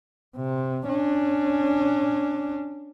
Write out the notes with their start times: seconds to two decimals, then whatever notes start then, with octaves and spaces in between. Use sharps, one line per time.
0.36 C3
0.86 C#4 D4